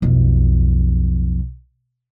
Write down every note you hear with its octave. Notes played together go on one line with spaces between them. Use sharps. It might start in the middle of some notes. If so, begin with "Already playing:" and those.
B1 F2